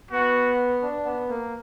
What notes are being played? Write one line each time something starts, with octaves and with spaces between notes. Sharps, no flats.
B3 F#4
D4
B3
A#3